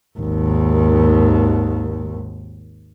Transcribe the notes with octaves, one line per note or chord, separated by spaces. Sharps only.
G#1 D#2